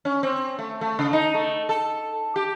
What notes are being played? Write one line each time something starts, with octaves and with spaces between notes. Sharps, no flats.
C#4
C4
A3
A3
C#3
D#4
A3
A4
G4